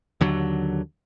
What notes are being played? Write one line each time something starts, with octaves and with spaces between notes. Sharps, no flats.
D#2 D3 F#3